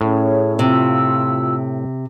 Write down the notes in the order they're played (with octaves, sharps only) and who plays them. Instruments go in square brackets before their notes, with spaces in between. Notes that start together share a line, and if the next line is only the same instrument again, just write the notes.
[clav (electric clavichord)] A2 [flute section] C#4 G#4 C#5
[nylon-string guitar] C3 [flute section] F4 E6